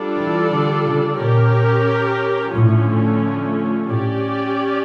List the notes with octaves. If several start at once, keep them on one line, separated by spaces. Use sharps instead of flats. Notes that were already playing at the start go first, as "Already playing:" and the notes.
Already playing: G3 D4 F4 A4 D5
E3
D3
C#3
A#2 C#4 G4 A#4
A2 D3 F3 A3 C#4
A2 C#4 G4 D5